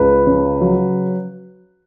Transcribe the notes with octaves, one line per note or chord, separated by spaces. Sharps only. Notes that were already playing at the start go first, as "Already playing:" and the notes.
Already playing: C#2 B4
C#3
F#3